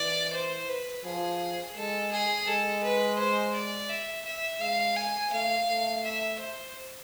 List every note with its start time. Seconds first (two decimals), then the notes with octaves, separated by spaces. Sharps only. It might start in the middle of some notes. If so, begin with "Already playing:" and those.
Already playing: E3 D5
0.33 C5
0.69 B4
1.04 F3 G#4
1.76 G#3 A4
2.12 G#4
2.47 G#3 A4
2.83 B4
3.18 C5
3.54 D5
3.89 E5
4.26 E5
4.61 G#3 F5
4.96 G#5
5.32 A3 F5
5.68 A3
6.04 E5
6.39 C5